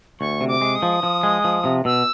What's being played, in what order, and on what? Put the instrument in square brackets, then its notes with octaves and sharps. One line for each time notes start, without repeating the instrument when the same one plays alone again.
[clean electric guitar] D2 [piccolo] C#6
[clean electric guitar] C3
[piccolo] D6
[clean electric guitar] G#3
[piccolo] D#6
[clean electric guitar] F3
F3
G#3
F3
C3
[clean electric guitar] B2 [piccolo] E6